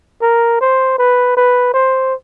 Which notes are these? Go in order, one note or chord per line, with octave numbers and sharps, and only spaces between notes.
A#4
C5
B4
B4
C5